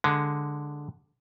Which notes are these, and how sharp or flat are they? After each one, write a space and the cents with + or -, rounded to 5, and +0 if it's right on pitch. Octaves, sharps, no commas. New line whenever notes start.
D3 +0 G#3 +5